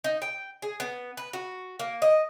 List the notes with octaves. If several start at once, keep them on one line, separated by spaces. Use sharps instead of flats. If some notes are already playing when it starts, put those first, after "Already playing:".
D#4
G5
G#4
B3
B4
F#4
A#3
D#5